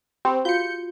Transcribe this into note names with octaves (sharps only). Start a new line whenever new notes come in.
C4 G4 B5
F4 F#4 F5 G6 C#7